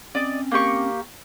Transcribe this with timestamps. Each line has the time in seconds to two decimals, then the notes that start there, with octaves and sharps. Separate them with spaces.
0.15 C4 C#4 D5 D#5
0.52 A#3 G4 C#6